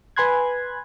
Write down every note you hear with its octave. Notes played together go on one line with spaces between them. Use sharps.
B4 G#5 B5 C6 F#6 G#6